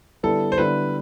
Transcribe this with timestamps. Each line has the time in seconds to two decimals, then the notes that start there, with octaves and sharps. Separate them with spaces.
0.23 D3 G3 B3 E4 A4
0.52 C5
0.58 D3 G3 B3 E4 B4